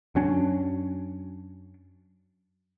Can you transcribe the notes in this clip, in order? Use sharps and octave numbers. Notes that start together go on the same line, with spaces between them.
F#2 F#3 C#4 D4